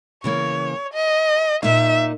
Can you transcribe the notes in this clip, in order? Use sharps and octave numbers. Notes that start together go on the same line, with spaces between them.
C#3 E3 A#3 C#5
D#5
A#2 A#3 D#4 E5